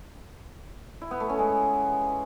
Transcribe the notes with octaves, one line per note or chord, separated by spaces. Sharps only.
E4
B3
A3
C#4
G#3